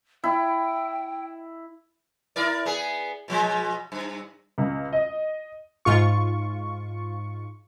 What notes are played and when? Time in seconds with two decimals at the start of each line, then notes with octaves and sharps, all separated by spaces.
0.24 E4 G5
2.36 E4 A#4 D5
2.65 B3 G#4
3.28 B2 F3 G#3
3.92 G2
4.58 C#2
4.92 D#5
5.85 G#2 F4 C#6